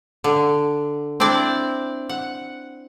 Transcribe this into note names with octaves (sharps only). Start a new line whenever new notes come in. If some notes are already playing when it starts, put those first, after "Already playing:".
D3
C4 D4 E4 D5
F#5